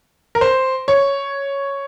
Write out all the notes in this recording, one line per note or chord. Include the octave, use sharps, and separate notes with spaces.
A#4
C5
C#5